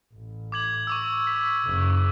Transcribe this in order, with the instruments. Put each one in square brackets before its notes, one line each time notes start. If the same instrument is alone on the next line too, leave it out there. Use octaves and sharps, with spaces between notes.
[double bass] A1
[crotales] D6 G#6 F#7
C#6 D6 E6
B6
[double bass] F#1